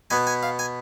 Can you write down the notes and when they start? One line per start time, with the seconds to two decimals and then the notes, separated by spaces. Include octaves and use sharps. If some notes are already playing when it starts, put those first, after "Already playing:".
0.10 B2 B3 G#5
0.27 G#5
0.43 F5
0.59 G#5